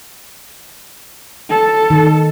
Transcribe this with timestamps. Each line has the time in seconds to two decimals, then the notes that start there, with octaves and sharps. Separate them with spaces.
1.49 A4
1.90 D#3